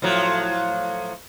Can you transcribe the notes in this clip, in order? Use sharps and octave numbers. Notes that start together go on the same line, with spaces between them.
A2 F3 F#3